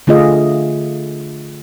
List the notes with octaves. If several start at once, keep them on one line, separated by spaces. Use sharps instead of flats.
D3 A3 F4 G#4 D#5